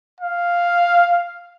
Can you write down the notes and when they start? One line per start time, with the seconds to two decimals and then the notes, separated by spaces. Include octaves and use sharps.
0.20 F5